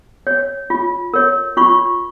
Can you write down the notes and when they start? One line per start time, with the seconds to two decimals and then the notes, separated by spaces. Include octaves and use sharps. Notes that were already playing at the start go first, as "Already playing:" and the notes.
0.27 C#5
0.70 F4
1.14 A#4 C#5
1.57 F4 C#6